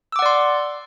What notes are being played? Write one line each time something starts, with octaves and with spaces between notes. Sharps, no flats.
D5 F#5 C6 D6 E6